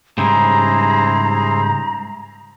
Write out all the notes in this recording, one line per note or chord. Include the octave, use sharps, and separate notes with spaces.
G#2 C#3 G3 E4 G#4 C5 A#5